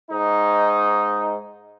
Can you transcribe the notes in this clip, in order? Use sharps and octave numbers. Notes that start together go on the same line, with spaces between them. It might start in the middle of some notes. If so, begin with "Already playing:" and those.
G#2 D#4